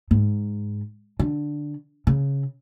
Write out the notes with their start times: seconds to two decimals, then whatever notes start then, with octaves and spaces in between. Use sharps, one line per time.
0.11 G#2
1.19 D3
2.07 C#3